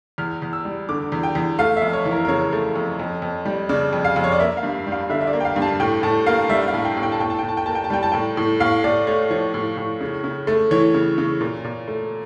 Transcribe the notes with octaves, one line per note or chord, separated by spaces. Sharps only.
E2 F6
E2
E6
G3
D3 D6
E2
G5
E2
A3 F5
E5
F2
C#5
E3
A#4
A#4
C#3 C#5
A3
F2
F2
F2
G3
C#3 D5
F2
F5
F2
C#5
D5
A#3 E5
F5
G2
G3
F5
D3 E5
E5
D5
A#3
G5
F5
G2
A5
A2 G5
A2 A5
A#3 F5
G3 E5
F5
A2
G5
A2
G5
A5
A2 G5
A5
G5
A2
A5
G5
A#3 A5
G5
A5
G3 G5
A5
A2 G5
A2
A2 F5
A2 D5
A3 C#5
F3 C#5
A2
A2
C#3
C#3
A3
E3 C#5
C#3
C#3
A#2
A#2
A3